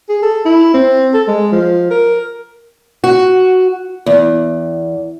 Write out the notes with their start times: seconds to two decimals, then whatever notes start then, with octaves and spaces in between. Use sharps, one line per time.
0.09 G#4
0.23 A4
0.45 E4
0.74 C4
1.14 A4
1.28 G#3
1.52 F3
1.91 A#4
3.04 F#4
4.06 E2